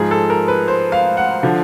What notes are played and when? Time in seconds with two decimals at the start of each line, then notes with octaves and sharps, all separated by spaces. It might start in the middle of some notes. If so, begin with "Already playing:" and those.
Already playing: G#2 F3 G#4
0.11 A4
0.30 A#4
0.48 B4
0.68 C5
0.92 F5
1.17 F#5
1.43 D3 F3